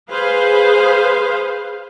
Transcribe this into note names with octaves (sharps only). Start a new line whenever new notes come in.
G#4 B4 C5 F5